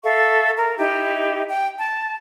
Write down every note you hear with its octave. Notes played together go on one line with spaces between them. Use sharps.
A4 E5 F5 C#6
A#4
D#4 E4 G4
G5
A5